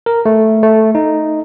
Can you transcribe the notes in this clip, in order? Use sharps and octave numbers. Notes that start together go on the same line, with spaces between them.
A#4
A3
A3
D#4